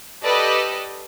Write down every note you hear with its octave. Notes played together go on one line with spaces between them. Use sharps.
G4 A4 B4 D5 D#5